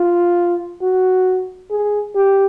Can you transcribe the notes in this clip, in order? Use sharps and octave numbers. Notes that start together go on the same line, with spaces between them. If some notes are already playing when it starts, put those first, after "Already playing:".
Already playing: F4
F#4
G#4
G4